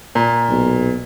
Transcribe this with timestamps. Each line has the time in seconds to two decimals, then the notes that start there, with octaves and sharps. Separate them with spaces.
0.15 A#2
0.49 B1